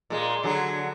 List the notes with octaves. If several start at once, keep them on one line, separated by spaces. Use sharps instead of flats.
A#2 G#3
D3 F#3 G#4